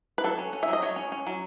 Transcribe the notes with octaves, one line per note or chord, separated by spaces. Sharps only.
B4
F#3 A4
C#4
C#4
E5
F#3
D#5
F#3 C#5
C#4
C#4
F#3